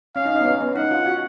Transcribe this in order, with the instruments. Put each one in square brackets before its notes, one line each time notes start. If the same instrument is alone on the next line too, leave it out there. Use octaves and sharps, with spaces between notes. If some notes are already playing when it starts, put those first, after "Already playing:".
[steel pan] C#4 [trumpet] F5
[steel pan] D#4
D#4
B3
C#4
B3
[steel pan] D#4 [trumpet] F#5
[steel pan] F4
F#4